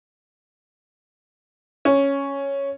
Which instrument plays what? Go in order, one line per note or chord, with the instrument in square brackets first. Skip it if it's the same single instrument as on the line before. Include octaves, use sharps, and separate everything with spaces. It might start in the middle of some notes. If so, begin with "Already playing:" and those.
[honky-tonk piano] C#4